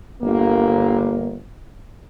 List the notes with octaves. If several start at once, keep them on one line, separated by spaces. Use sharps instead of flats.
G1 A#3